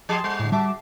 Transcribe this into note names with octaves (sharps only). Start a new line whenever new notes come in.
F3 G4 G#4 A5 C6
G3
A2 D3
G3 F#4 E5 A5 D6